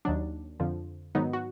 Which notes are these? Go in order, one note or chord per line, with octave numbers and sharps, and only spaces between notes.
D#2 D#3 F#3 D4
F2 D3 F3
G#2 D#3 F#3 B3 D#4
F#4